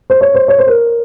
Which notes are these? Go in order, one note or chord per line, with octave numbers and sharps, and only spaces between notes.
C5
C#5
C5
C#5
C5
A#4